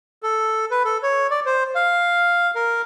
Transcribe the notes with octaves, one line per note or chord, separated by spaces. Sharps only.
A4
B4
A4
C#5
D5
C5
F5
A#4